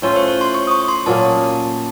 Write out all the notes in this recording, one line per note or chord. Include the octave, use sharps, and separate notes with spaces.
A2 A3 C#4 F4 C#5
C5
C#5
C6
C#6
D#6
C#6
C6
A#2 F#3 A#3 C#4 A5